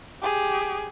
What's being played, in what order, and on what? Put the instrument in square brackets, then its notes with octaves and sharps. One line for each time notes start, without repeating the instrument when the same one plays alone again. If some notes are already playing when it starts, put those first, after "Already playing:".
[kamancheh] G4 G#4